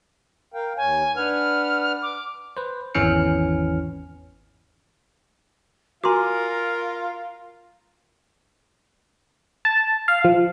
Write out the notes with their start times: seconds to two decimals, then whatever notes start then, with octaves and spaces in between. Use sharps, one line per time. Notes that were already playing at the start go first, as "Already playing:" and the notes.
0.54 A#4 F5 G5
0.77 D#2 C#5 G#5
1.16 D4 B4 F#5 F6
2.02 D6
2.57 B4 C5
2.95 G#1 E2 E3 C#4 F6 C#7
6.04 F4 F#4 A#4 F5 G#5 A#5 C6 D6
9.65 A5
10.08 F5
10.24 F3